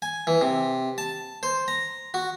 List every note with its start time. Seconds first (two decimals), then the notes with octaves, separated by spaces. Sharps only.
0.02 G#5
0.27 E3
0.42 C3
0.98 A5
1.43 C5
1.68 A#5
2.14 F#4